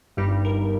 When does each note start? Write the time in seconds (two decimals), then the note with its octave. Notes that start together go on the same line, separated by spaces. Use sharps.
0.17 G1 G2 G3 D#4 G4
0.45 A#4